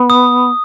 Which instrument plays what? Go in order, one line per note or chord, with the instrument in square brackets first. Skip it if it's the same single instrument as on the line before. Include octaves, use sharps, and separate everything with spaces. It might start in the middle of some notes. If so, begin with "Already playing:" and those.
Already playing: [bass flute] B3
[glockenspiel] D#6